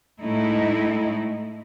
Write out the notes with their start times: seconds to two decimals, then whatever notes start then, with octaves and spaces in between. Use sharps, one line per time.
0.22 A2 G#3 A3 D#4 E4